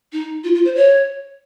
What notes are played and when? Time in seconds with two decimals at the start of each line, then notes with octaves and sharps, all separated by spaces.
0.13 D#4
0.44 F4
0.55 F4
0.65 C5
0.76 C#5